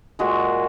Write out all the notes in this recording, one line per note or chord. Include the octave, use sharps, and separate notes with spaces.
A#2 G#3 F#4